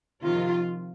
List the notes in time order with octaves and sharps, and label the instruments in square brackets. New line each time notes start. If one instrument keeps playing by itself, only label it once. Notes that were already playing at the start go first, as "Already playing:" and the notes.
[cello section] C3 D#3 F3 F4